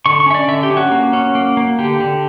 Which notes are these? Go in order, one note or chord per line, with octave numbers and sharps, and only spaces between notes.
D3 C#6
C#6
C#4 E5
D5
D3 E5
G4
C#4
F#4
A#3
C#4
A#3
A#3
D3 G4
D3